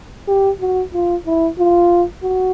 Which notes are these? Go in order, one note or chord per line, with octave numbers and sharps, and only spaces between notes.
G4
F#4
F4
E4
F4
F#4